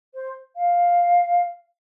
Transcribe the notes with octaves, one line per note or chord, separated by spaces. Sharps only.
C5
F5